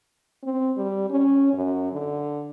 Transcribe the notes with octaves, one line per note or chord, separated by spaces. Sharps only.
C4
G3
C#4
F#2
D3